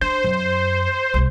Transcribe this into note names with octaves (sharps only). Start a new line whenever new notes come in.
D4 C5
F#2
C2 C3